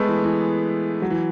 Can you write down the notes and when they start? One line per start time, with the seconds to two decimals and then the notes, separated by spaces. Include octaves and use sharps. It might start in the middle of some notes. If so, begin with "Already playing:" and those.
Already playing: G#3 A3 B3
0.09 E3
0.24 E3
1.02 F#3
1.10 E3